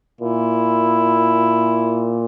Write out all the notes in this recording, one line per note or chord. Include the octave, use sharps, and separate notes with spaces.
A#2 E4